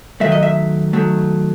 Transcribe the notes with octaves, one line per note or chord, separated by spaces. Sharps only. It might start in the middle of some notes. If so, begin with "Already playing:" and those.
D#3 F#3 A3 E5
D#5
E5
D#3 F#3 A3